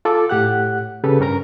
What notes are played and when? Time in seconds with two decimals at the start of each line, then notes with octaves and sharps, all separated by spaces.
0.05 F4 A4 D6
0.30 A2 G4 F#5 F#6
1.04 C#3 G4 A4 B4
1.20 G2 C#4 A#4 A#5